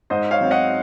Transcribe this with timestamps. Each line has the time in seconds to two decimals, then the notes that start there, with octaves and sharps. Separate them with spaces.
0.10 G#2 C5 D#5
0.31 C#5 F5
0.40 F#3 C4
0.51 D#5 F#5